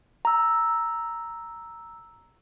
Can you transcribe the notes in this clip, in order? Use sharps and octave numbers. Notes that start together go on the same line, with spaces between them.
A#5 E6